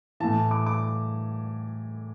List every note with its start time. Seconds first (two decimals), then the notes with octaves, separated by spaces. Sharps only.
0.20 A2 E3 A5
0.51 D6
0.66 D6